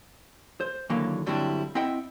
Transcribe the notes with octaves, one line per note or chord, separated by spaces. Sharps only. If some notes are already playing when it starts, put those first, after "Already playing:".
C5
D#2 D3 E3 F#3 A#3 F5
G2 D3 F#3 G3 C4 E4
C4 E4 D#5 E5 F#5 G5